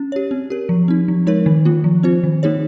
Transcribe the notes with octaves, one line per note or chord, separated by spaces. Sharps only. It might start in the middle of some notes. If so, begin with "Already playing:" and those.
Already playing: C#4
G4 C#5
C4
G4 A#4
F3
C4 D#4
F3
G#3 D#4 A#4 C#5
D#3
A#3 F4
F3
C4 F4 C5
D#3
A#3 D#4 G#4 C#5